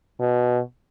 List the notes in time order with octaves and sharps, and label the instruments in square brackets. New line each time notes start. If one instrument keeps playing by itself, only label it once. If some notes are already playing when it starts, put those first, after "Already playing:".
[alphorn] B2